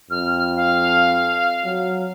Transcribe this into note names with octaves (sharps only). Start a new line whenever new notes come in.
F2 F6
F5
F#3